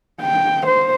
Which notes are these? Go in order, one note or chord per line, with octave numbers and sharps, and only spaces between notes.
G5
C5